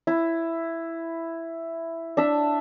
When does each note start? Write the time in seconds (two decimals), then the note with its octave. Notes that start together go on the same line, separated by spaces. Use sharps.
0.07 E4
2.17 D4 E5